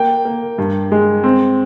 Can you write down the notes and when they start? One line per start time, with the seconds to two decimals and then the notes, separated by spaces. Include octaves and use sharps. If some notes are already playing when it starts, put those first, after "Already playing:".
Already playing: A#3 G5
0.25 A#3
0.58 G2
0.92 G#3
1.24 C4